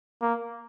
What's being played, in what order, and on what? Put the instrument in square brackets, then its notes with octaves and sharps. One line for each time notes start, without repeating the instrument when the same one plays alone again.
[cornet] A#3